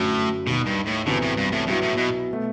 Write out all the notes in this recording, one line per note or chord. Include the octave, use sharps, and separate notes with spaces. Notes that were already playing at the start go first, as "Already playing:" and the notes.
Already playing: G1 F#2 A2 F#3 A3
D#2 B2 D#3 G3
G2
A2
C2 A2 C3 E3 B3 F#4
A2
G2
A2
G2 B2 F#3 B3 E4
A2
B2
B2 A3